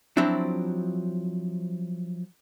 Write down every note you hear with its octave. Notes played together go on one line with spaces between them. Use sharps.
F3 F#3 C4 D4 E4